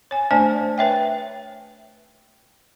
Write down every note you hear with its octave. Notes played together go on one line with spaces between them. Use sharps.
C#5 G#5
A3 D4 C5 D5 G#5 A5
B4 C#5 E5 G5